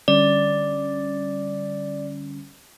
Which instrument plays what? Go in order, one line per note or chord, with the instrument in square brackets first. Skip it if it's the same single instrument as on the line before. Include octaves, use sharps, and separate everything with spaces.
[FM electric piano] D3 G3 C#4 [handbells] D5